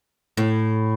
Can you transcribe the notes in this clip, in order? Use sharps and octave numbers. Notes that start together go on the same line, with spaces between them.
A2